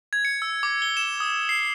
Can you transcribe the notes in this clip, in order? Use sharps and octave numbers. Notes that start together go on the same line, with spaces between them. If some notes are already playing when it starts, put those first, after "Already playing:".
G#6
C#7
E6
D6
G7
E7
D#6
C7